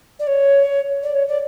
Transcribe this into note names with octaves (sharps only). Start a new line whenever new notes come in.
D5
C#5
D5
C#5
D5